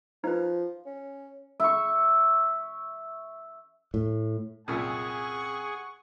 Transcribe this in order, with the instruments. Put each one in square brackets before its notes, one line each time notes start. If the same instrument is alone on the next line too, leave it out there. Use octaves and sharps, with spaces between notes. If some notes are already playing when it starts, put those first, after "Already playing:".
[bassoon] F3 [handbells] D#4 B4
[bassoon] C#4
[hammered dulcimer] E5 C#6
[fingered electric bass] A2
[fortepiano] C2 F#2 A#2 [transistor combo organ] G#4 [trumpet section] F#5 G#5 C#6